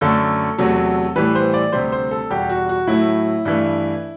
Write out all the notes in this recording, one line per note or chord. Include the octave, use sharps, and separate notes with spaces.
F#2 D3 A3 A4
E2 C3 F#3 A3
A2 E3 G3 B4
C5
D5
D2 C3 G3 C5
C5
A4
E2 B2 G3 G4
F#4
F#4
A2 F#3 A3 E4
G2 E3 A3